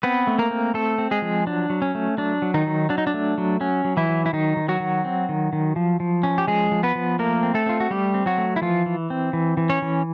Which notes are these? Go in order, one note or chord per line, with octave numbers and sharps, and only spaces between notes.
B3 C4 B4
A3
A#3 A#4
C4
A3 C4 A4
C4
G#3 G#4
F3
F#3 D4
F#3
C#4
A3
F#3 D4
F#3
D#3 D#4
F#3
F#3 D4
D#4
D4
A3
F#3
F#3 C#4
F#3
E3 E4
F#3
E4
D#3 F#3 D#4
D#3
F#3 F#4
D#3
C4
D#3
D#3
F3
F3
C#4
G4
F3 G#3 G#4
F3
B3 B4
F3
A3 A#3 A#4
C4
A3 A4
C4 F4
F#4
G3 A3 G4
C4
F#3 F#4
A3
E4
E3 F3 F4
E3
C4
E3
E3
C#4 C#5
E3